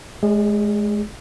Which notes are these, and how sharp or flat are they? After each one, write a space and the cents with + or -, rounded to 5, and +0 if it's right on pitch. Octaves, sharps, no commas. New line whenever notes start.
G#3 +25 G#4 -30 D5 -15